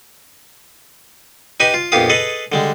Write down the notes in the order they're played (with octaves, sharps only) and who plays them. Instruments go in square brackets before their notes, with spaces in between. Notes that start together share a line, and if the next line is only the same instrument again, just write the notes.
[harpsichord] D#4 G4 B4 D#5 G#5
F4
A#1 F2 B3 G4 F5 D#6
G#4 A4 B4 D#5
D3 G3 G#3